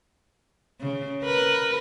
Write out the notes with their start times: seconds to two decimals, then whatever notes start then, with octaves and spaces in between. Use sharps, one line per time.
0.81 C#3
1.23 A#4 B4